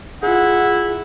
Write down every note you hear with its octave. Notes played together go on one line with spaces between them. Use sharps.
E4 F4 G#4 F#5